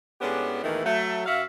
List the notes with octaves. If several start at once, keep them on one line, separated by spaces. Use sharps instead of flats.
A2 G#3 B3 C#4 D4 G4
E2 A#2 D#3 E3 A3
F#3 A3
F#2 F#4 E5 F5